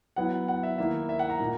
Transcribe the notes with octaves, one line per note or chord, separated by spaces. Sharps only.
F#3 B3 E4 F#5
F#5
E5
D#3 A#3 E4 E5
E5
F#5
A#5
A#2 A#3 D#4